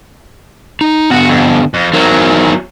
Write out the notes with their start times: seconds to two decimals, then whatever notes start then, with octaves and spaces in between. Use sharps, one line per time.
0.81 D#4
1.11 D3 B3 F#4
1.29 F2
1.74 F2
1.94 E2 F#3 D#4 A#4 C5